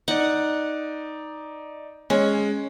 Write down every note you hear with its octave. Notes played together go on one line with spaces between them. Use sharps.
D#4 D5 F#5
G#3 C#4